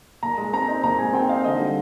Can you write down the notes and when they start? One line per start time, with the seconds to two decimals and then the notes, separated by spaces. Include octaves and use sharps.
0.23 A#2 A#5
0.38 G#3
0.53 C4 A#5
0.68 D#4
0.83 A#2 A#5
0.99 G#3 G#5
1.13 C4 G5
1.29 D#4 F5
1.44 D3 D#5
1.60 G3